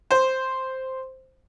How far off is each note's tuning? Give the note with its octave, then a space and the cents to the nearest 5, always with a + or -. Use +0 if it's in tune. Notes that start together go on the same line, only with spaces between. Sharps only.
C5 +0